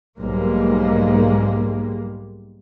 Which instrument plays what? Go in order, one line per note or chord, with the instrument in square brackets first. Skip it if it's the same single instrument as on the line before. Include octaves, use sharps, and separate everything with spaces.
[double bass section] B1 G#2 G3 G#3 A#3